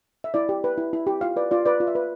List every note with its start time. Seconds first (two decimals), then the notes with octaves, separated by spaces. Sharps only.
0.24 E5
0.34 E4 D5
0.49 G4
0.64 B4
0.78 E4
0.93 E4
1.07 G4
1.21 F4 F5
1.36 B4 D5
1.51 F4 D5
1.66 B4 D5
1.80 F4
1.87 E5
1.95 B4